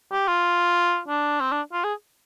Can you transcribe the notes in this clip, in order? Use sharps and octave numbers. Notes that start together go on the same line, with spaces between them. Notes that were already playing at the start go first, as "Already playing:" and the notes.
G4
F4
D4
C4
D4
F4
G#4